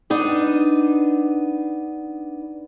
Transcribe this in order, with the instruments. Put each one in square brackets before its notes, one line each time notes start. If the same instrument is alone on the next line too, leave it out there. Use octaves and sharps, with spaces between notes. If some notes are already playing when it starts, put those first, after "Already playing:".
[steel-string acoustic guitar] B3 D4 D#4